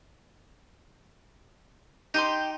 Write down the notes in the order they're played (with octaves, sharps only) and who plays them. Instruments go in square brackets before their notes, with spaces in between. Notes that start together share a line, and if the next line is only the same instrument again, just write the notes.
[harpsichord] D#4 [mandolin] G4 G5 C6